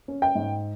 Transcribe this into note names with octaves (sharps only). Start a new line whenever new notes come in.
C#4
G5
G#2